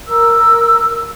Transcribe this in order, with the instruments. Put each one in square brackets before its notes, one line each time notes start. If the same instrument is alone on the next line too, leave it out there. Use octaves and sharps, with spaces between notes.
[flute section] A#4 E6